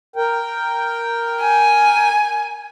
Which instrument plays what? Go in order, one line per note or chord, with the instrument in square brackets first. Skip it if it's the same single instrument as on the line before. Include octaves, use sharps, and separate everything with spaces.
[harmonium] A#4 G5
[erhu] G#5